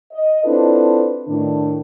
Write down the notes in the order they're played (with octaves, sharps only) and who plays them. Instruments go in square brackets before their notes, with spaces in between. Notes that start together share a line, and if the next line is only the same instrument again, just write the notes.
[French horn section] D#5
C4 D4 E4 F4 A4 B4
A2 D#3 D4